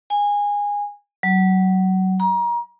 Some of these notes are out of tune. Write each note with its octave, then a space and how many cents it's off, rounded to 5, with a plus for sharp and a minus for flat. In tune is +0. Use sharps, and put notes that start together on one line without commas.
G#5 -20
F#3 +25
A#5 +30